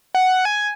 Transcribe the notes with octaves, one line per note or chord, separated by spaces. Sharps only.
F#5
G#5